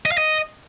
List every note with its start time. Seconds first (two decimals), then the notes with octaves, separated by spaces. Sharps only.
0.06 D#5
0.12 F5
0.18 D#5